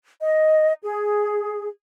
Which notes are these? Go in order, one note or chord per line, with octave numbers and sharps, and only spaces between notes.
D#5
G#4